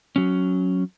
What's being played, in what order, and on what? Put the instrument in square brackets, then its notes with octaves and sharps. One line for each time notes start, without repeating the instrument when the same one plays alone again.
[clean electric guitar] F#3 C#4